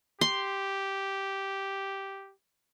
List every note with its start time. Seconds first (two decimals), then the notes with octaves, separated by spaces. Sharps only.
0.21 G4 C6